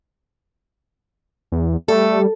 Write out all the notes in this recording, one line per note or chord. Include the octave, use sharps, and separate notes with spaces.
E2
G3 A3 A4